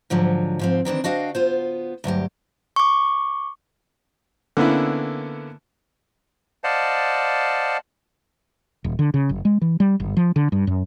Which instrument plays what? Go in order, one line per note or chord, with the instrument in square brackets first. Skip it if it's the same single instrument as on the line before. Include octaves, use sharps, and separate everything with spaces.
[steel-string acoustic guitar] G#2 D3 F3 F#3
G#2 F3 C4
D#3 E3 C4 D4
D4 F#4 D#5 F5 G5
B3 F4 C5
D2 G2 F#3 G4
[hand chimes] C#6 D6
[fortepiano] D3 A#3 B3 C#4 E4
[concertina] C5 D5 D#5 F5 F#5 A5
[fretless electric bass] D#1
D3
C#3
F#1
G#3
E3
G3
G1
F3
D3
G2
F#2